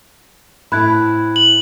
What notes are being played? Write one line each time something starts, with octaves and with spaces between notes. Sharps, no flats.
A2 C4 E4 B5 F#6 G#6
F#7